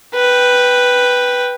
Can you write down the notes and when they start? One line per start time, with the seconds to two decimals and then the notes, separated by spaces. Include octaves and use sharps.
0.14 B4 G5